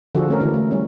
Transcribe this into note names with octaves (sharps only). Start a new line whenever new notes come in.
D3 F3 D4 F#4 G#4 A4
A3 C#4 A#4
D3 E3 G#3 D4
A3
G3 C#4